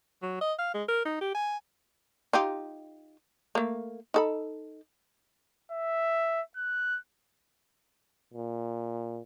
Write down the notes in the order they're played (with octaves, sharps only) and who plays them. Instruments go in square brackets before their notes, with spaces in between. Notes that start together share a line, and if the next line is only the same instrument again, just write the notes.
[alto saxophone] F#3
D#5
F5
G#3
A#4
D#4
G4
G#5
[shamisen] D#4 F4 G4
A3 A#3
D#4 A4 B5
[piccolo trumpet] E5
F#6
[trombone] A#2